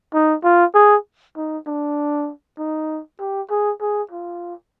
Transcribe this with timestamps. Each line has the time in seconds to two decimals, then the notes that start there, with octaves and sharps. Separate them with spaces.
0.14 D#4
0.43 F4
0.74 G#4
1.36 D#4
1.67 D4
2.58 D#4
3.20 G4
3.50 G#4
3.81 G#4
4.11 F4